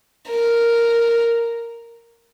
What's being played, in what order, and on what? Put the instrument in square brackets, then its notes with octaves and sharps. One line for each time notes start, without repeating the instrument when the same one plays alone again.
[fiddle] A#4